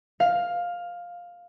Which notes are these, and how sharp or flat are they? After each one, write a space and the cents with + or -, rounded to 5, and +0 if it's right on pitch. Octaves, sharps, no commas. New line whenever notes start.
F5 +10